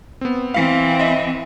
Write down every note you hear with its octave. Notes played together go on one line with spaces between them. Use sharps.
B3 C4
E3 C4 F5
D#5 E5